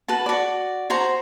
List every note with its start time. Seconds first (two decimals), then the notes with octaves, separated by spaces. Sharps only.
0.08 F#4 B4 A5
0.26 F#4 D5
0.90 F#4 C5 A#5